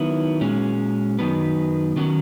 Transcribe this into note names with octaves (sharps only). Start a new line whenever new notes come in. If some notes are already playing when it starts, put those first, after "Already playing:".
Already playing: D#3 F#3 B3 E4
A#2 G#3 C#4 F#4
F#2 D#3 F#3 B3
D#3 F#3 C#4 F#4